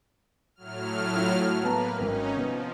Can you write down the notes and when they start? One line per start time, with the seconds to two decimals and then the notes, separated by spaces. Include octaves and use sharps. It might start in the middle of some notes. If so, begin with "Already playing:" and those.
0.56 A2 F#3 F6
1.13 E4 F4
1.63 A#3 B3 B4 A5 A#5
1.99 G#1 C4 C#4 D#4 A#4
2.37 C3 F3 B3